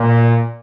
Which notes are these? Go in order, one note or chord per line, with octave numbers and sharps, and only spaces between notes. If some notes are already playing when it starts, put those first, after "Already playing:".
Already playing: A#2